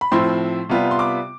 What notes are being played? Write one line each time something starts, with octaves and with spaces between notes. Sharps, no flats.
B5
A2 F3 C4 E4 C6
C3 G3 B3 F4
C6
D6